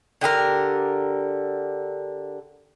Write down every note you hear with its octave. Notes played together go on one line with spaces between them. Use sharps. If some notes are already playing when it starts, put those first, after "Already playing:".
D3 G4 G#4 A#4